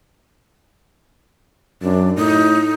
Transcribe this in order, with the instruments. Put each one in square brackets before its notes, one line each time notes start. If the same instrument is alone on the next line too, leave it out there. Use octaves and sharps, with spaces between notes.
[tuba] F#2 [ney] D4
[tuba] A2 [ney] D#4